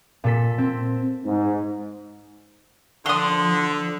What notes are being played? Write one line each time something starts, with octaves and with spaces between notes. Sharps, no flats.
A#2 A4 B6
C4
G#2
D3 F3 C6 D#6